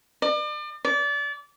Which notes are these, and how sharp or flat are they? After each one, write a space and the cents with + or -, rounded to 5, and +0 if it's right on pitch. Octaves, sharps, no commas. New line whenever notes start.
D5 +40
D5 -30